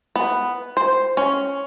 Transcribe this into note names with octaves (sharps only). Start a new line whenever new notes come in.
B3
C5
C#4